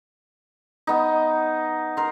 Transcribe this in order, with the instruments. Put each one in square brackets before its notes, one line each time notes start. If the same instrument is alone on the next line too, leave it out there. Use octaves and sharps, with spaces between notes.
[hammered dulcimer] B3 D#4
A#4 C6